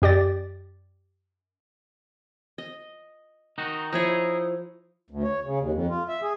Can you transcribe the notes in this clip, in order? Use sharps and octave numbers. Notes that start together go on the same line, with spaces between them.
F#2 G4 D5 A6
D#5
D#3 D#4 F#4
F3 D#4 E4 G#4 C#5
D2
C#5
C#3
D#2
F2
F4
E5
G#4